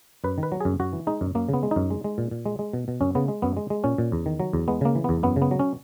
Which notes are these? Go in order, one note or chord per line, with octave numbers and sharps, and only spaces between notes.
F#2 B4
D#3
B4
F#3
F#2 G#4
F#2 F#4
E3
G#3 D#4
F#2
F#2 A#3
C#3
B3
G#3
F#2 D#4
G#3
G#3
A#2
A#2
G#3
G#3
B2
B2
F#2 C#4
C#3 B3
G#3
F#2 B3
G#3
G#3
A#2 C#4
A#2
E2
D#3
F#3
E2
G#3 B3
C#3 A#3
E3
E2 B3
F#2 B3
C#3
B3
F#3
C#4